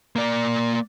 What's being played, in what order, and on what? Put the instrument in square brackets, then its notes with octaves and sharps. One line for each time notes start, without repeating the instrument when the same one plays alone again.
[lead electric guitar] A#3 D5